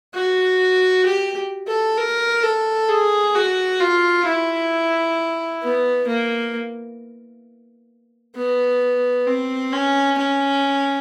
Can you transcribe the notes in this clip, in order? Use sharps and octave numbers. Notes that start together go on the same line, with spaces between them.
F#4
G4
A4
A#4
A4
G#4
F#4
F4
E4
B3
A#3
B3
C4
C#4
C#4